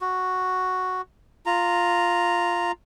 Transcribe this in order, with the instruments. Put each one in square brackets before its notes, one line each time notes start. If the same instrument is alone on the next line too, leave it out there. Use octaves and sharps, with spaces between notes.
[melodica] F#4
F4 A#5